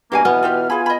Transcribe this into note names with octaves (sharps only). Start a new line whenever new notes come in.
G2 B2 A#3 F#4 F5 G#5
B2 E3 B3 F6
F4 G4 B4
F4 G#4 G#5 B5
D#5 B5